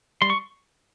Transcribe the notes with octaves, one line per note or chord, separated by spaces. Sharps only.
G3 C6
C#6